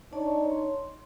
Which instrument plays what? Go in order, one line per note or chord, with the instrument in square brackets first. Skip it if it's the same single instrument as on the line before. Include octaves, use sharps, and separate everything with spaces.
[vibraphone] D4 D5 A5 [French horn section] D#4 C#5
[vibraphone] C6